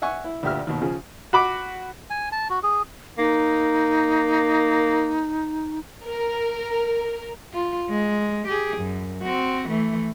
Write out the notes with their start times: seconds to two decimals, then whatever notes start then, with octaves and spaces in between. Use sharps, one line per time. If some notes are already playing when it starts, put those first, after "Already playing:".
0.02 E5 F#5 G#5 C#6
0.24 E4
0.43 D2 A#2 G4 E5 F6
0.67 D#2 B2
0.81 C#3 F3 G#4
1.33 F#4 B5 D6
2.10 G#5
2.32 A5
2.50 F#4
2.63 G#4
3.18 A#3 D#4
6.04 A#4
7.53 F4
7.90 G#3
8.48 G4 G#4
8.77 F#2
9.23 C4 F#4
9.69 E3 A3